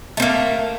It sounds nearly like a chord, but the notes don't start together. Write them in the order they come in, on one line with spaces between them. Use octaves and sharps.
A3 C4 A#3